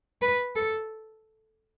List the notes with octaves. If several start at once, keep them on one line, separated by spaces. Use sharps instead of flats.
B4
A4